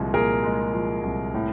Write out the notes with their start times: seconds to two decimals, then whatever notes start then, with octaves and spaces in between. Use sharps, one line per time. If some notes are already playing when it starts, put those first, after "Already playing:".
Already playing: C2 A#2 F3 G#3
0.14 A#2 G#4 A#4
0.44 G#3
0.74 F3
1.03 C2
1.34 A2